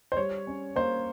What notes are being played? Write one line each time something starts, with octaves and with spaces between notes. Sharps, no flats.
C5
G3 C#5
C#4
A#3 C5